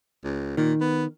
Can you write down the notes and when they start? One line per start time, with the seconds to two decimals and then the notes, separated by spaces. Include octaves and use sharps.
0.24 C#2
0.57 A#2 D#3
0.80 B3